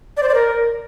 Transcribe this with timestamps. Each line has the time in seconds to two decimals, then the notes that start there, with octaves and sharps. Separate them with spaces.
0.17 D5
0.23 C5
0.29 D5
0.34 A#4